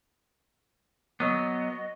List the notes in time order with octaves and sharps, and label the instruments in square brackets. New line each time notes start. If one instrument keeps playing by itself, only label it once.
[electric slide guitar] F#3 B3 [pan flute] D#5